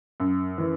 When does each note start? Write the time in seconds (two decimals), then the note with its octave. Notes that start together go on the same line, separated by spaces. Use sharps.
0.20 F#2
0.58 E3